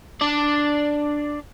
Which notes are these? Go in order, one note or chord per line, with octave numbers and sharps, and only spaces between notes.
D4 D5